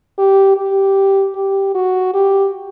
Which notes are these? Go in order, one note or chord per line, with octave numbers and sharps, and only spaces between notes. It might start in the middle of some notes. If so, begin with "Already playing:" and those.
G4
G4
G4
F#4
G4